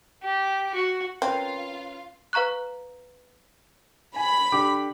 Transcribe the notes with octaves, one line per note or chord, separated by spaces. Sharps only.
G4
F#4
C4 C#4 F4 A#4 B4 F5
B4 F5 A#5 C#6 F#6
G#5 B5
D3 G4 D6